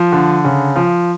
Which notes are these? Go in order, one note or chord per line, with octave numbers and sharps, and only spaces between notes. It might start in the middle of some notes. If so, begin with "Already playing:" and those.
Already playing: F3
D3
C#3
F3